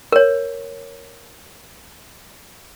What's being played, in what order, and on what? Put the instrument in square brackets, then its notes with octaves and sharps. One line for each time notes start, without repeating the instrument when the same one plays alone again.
[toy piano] A#4 C#5